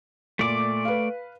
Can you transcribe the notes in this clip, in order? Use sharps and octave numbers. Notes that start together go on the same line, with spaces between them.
A#2 A3 D5 D6
B4 F5